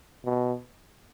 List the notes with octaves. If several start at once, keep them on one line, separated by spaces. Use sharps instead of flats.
B2